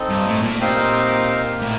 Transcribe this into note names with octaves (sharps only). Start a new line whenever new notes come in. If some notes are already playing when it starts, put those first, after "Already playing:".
Already playing: C4 D#4 A4
G2
A2
A#2
C4 D#4 G4 A#4 F5
A2 A#3